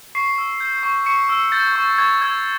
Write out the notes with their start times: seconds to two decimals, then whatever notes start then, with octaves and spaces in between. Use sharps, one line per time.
0.15 C#6 C7
0.38 E6
0.60 G6
0.83 C#6
1.06 C#6 C#7
1.29 E6
1.52 G6 A6
1.76 C#6
1.98 C#6 G#6
2.21 E6 G#6